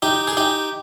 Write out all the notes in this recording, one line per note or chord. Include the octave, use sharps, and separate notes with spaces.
D#4 G4
G#4
D#4 G4